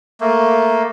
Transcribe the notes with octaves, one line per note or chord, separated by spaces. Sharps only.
A3 A#3